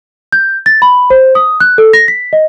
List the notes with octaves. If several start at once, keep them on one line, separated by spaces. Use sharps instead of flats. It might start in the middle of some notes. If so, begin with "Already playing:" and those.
G6
A6
B5
C5
D#6
F#6
A4
A#6
B6
D#5